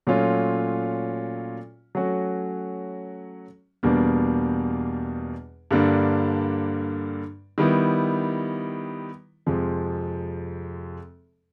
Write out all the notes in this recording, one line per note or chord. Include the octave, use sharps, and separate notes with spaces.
A#2 F#3 A3 C#4 F4
F#3 A3 C#4 F#4
E2 B2 G3 A#3 D4
G2 D3 G3 A#3 D4
D#3 G3 B3 E4
F2 C3 F3 G#3